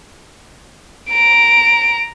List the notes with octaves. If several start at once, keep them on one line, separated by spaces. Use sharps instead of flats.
A#5 D7